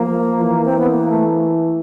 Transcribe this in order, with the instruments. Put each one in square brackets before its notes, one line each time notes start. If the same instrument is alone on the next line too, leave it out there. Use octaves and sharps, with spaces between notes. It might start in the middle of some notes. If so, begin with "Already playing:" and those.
Already playing: [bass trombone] F3 [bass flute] A#3
[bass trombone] E3
[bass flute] C4
B3
A#3
A3